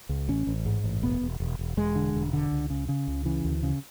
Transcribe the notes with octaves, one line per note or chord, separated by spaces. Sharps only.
C#2
A1 C#4
A1
G#2
A1
E1 B3
E1
E1
E1
E1 G#3
D3
E1
D3
C#2
C#3
C#3
C#2
C#3 E3
D2
C#3